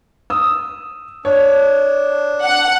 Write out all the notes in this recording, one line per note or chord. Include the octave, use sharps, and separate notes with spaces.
D#6 E6
D4 C#5
F#5